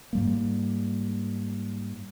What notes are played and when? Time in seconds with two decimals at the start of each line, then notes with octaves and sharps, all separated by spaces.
0.13 G#2 G3 A#3